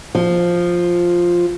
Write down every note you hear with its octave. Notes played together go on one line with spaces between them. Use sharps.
F3